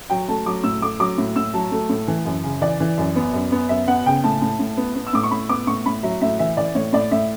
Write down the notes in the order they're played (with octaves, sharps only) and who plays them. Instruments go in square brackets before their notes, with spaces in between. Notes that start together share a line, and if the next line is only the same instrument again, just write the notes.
[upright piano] F#3 G5
A3 A5
F#3 D6
A2 E6
A3 D6
F#3 D6
A2
A2 E6
F#3 A5
A3
A2
E3
F#2
C#3
E3 D5
E3
F#2
B3
F#2
B3
F#2 E5
B3 F#5
C#3 G5
A2 A5
A2
A2
B3
B3
E6
A2 D6
C#6
A2 B5
B3 D6
A2 C#6
A2 B5
F#3 E5
A2 E5
E3 E5
E3 D5
A2 C#5
A2 D5
A2 E5